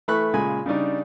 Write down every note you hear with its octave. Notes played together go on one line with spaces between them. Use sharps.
E3 A3 B5 C#6 F#6
A#2 C#3 G#3 G#5 B5
C#3 G3 D4 D#4